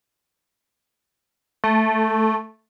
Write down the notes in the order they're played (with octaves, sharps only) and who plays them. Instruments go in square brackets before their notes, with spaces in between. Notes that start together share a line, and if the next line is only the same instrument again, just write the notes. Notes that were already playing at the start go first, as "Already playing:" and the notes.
[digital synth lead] A3